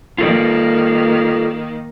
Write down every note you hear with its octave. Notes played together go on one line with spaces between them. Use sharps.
D#3 A#3 F4 A4 D5